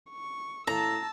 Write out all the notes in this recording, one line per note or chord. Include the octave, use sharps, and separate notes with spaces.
C#6
A2 F5 A5 A#5 E6